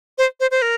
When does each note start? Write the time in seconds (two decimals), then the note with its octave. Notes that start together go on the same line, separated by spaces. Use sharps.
0.18 C5
0.40 C5
0.51 C5
0.62 A#4